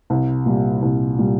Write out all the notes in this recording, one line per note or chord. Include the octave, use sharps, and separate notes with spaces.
C2
A#2 G3
C2
A#2 G3